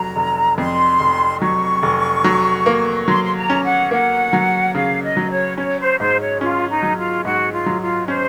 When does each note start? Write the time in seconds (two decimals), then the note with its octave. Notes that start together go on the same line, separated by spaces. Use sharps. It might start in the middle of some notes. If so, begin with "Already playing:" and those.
Already playing: F1 F#3 A#5
0.16 F1
0.58 F2 C6
1.00 F1
1.41 F#3 C#6
1.83 F1
2.24 F#3
2.66 A#3
3.08 F#3 C6
3.23 C6
3.36 A#5
3.50 C#4
3.63 F#5
3.91 A#3 F#5
4.33 F#3
4.75 C#3 F5
5.02 D#5
5.17 F#3
5.30 C#5
5.58 C#4 C#5
5.79 C5
6.00 G#2 C5
6.20 C#5
6.41 C#4 F4
6.69 D#4
6.83 F#3
6.97 F4
7.24 G#2 F#4
7.52 F4
7.66 F#3
7.81 F4
8.08 C#4 C5